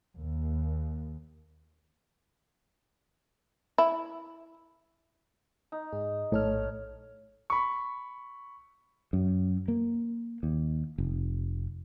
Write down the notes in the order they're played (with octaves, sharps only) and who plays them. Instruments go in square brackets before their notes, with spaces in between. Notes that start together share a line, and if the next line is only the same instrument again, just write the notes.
[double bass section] D#2
[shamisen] E4
[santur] D#4
[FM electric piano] G#2 G#4
[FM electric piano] A#1 A4 F6 [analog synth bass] A2 [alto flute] C#5
[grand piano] B5 C#6
[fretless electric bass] F#2
A#3
D#2
F1